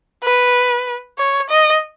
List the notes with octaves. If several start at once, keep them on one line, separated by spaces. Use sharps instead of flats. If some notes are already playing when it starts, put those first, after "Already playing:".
B4
C#5
D#5